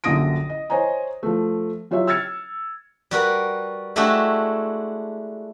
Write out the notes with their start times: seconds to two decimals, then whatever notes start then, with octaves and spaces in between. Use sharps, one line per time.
0.04 A#1 F#2 D3 D#6 A#6 D7
0.49 D#5
0.70 C5 C#5 D#5 G#5 A#5
1.23 F3 A3
1.91 F#3 F4 G4 C#5 E5
2.07 E6 F6 G#6 A6 C#7
3.11 G3 F#4 A#4 B4
3.96 G#3 A3 D4 E4 F#4 G4